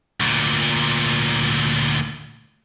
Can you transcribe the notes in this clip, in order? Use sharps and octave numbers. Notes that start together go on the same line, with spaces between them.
D2 A#2